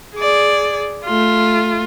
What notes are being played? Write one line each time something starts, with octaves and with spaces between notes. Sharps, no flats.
G#4 D5
A3 F4